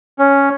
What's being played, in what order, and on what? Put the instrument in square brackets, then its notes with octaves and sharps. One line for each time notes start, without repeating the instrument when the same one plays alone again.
[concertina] C#4